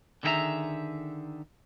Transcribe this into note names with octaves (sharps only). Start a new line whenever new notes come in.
D3 D#3 E4 G#4 E5 A#5